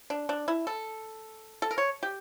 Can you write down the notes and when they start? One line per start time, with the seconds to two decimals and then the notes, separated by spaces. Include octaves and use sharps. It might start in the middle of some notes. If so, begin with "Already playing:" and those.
0.10 D4
0.29 D4
0.48 E4
0.67 A4
1.62 A4
1.71 A#4
1.78 C#5
2.03 G4